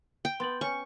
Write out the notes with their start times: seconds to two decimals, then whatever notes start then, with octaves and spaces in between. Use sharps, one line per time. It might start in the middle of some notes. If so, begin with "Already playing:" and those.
0.25 G5
0.40 B3 C6 A6 F#7
0.61 C#4 G#5 C#6